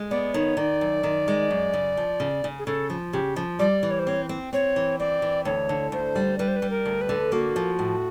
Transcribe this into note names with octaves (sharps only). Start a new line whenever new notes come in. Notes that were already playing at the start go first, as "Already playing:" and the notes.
Already playing: G#3
B3 D5
D#3 C#5
D#3 D5
F#2
D#3
G#3
F#2
C#3
F3
C#3
C#3
G#4
C#3 A4
F3
C#3 G4
F3
G3 D5
E3
C#5
C5
C4 C#5
C4
C4 C#5
E3
C4 D5
E3
D2 C#5
D3
D2 C5
G3
G3 B4
C5
B4
G3
A#4
D2
B4
D3
A#3 F#4
F3
A2